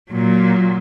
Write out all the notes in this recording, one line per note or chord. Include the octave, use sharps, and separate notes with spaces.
A#2 F#3